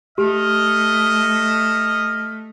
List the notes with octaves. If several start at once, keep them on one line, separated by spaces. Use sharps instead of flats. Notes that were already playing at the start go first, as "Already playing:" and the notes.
A3 G4 D#5 F6